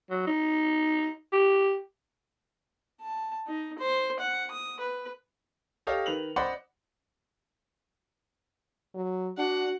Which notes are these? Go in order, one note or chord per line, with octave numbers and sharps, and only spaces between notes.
F#3
D#4
G4
A5
D#4
C5
F#5
D#6
B4
G4 A4 C#5 D#5 F5
D#3 B4 F7 F#7
C5 D5 D#5 F#5 B5 C6
F#3
D4 F#4 F#5